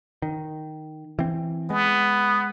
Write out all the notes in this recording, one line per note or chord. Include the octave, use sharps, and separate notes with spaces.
D#3
E3 C4
G#3 B3